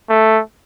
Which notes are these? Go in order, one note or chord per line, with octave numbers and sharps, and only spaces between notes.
A3